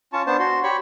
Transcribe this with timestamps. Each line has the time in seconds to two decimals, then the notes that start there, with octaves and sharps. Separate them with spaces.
0.13 C#4 F4 A5 C#6
0.27 B3 D4 C5 A5
0.39 F#4 C6
0.63 G4 C#5 B5 C#6